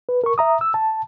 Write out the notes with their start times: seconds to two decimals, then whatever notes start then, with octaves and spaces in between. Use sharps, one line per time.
0.09 B4
0.24 A#4 C#6
0.38 E5 A#5 D#6
0.61 E6
0.74 A5